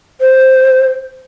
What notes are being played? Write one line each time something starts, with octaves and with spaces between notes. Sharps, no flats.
C5